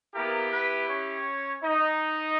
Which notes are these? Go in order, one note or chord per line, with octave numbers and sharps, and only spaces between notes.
A#3 B3 E4 G4 A#4
B3 B4
C#4 C#5
D#4 D#5